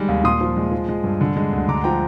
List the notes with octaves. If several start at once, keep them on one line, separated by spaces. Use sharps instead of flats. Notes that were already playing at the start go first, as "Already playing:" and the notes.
Already playing: D#3 G3 G#3
D#2
A#2 C6 D#6
F3
G#3
F3
G#3
G2
D3
G#3
D2
D3 A#5 D6
F3 G5 A#5